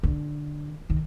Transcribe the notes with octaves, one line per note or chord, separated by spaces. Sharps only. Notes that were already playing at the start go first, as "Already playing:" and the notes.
D3
D#3